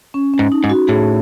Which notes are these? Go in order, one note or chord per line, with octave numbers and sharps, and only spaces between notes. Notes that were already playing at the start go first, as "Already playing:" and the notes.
C#4
C#4
G#2
D#4
G#2
F#4
A2 G#4